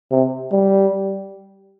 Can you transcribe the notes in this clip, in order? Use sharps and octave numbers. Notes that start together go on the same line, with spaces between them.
C3
G3